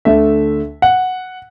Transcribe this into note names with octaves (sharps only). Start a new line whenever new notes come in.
D2 D3 A3 E5
F#5